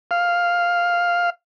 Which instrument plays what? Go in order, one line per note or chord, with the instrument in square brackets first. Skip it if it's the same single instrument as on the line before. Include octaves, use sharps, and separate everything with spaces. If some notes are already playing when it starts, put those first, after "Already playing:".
[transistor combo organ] F5